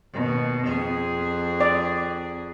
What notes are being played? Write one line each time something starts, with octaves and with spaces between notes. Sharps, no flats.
D#2 B2
F2 G#4
D5